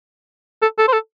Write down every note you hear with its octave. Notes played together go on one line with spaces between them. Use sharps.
A4
A4
C5
A4